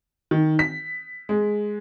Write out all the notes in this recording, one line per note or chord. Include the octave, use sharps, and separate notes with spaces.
D#3
B6
G#3